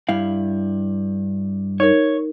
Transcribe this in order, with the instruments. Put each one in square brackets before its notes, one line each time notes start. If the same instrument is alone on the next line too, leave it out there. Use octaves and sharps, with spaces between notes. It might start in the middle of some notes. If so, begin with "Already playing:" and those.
[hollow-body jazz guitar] G2 E4 F5
[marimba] D#4 A#4 [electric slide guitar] C#5